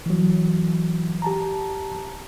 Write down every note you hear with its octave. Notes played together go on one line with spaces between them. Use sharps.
E3 F#3
G4 A5 A#5